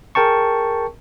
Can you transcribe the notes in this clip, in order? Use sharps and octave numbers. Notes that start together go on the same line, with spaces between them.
G#4 A#4 G5 A5 C#6